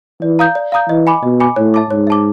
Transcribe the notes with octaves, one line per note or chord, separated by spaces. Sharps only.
E3 D5
F5 A#5 D#6 G6
D5
F5 A#5 D#6 G6
E3 D#5
G#5 B5 D6
B2 D#5
G#5 B5 D6
A2 C#5
E5 A5 D6
G#2 C#5
E5 A5 D6